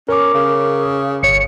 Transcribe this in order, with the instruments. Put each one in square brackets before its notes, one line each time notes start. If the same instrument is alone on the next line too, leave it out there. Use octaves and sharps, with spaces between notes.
[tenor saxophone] C#4 [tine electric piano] A#4 D6
[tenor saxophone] C#3
[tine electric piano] G1 C#5 [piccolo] C#7